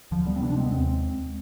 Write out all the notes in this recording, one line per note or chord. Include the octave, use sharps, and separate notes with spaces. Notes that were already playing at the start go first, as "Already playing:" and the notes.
D2 D3 F3
G3 B3
C4
C3 B3 D4
D4
G#3 C4
B3
D#2 G#3 C4